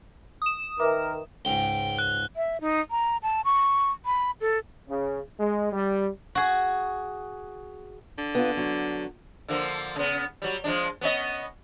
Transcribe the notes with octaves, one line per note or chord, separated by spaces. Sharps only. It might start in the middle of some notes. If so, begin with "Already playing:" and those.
D#6 E7
D#3 A#4 B4 E5 D6
C#2 G#2 G5 G7
F#6
E5
D#4
A#5
A5
C#6
B5
A4
C#3
G#3
G3
F#4 G#4
D3
B3 F4
F#3 D4
D3 F3 A#3
C#3 B3
F#3 G3
F3 G#3 D4
B3 C#4 D#5